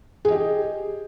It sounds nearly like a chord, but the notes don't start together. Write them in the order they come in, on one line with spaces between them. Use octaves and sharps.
G#4 D#5 G4